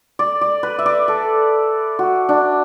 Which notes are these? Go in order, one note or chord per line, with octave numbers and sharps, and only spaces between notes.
D5
D5
B4
E5
D5
A4
F#4
D4